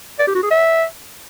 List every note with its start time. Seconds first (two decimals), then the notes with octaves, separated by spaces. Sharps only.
0.19 D5
0.27 G4
0.35 F#4
0.42 G#4
0.50 E5